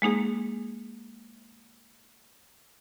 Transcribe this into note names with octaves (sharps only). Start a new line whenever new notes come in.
G#3 A#3 D#4 G#4